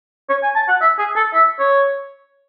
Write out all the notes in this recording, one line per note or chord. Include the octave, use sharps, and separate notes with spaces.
C#5
G#5
A5
F#5
E5
G#4
A4
E5
C#5